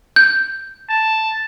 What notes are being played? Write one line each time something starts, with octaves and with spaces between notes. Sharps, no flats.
G6
A5